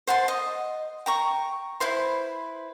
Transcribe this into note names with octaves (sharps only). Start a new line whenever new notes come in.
C5 F#5 A5 C6
D#5
G5 A#5 C#6
E4 B4 C5 C6